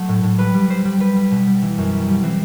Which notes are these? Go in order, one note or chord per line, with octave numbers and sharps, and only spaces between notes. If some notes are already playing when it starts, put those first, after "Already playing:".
Already playing: F#3 A3
A2
A2
G3 B4
G3
G3 C5
G3
G3 B4
G3
B2
G3
E3
F#2
G3
G3
E3 C4